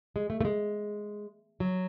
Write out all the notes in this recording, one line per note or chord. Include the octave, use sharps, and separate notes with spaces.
G#3
A3
A3
G#3
F#3